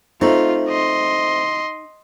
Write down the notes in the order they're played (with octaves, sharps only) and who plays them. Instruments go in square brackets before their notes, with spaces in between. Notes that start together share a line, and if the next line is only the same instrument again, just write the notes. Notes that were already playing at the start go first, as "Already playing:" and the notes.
[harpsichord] C3 A3 [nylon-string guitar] D#4 [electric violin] F4
[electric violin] D#5 C6